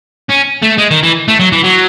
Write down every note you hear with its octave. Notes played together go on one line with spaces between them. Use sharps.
C#4
A3
G#3
D#3
E3
A3
F#3
E3
F#3